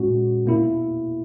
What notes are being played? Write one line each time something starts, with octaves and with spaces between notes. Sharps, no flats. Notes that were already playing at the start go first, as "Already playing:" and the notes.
Already playing: A#2 G#3 C#4 F#4
B2 A#3 E4